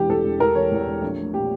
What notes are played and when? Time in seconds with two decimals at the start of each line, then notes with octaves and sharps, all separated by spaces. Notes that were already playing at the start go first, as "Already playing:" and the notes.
Already playing: E1 E3 G4
0.09 E2 A4
0.25 E1
0.40 E1 A#4
0.55 E3 C#5
0.72 E2
0.87 E1
1.02 A#1
1.18 A3
1.34 A#2 G4